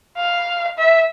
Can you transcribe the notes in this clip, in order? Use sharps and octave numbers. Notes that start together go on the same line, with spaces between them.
F5
E5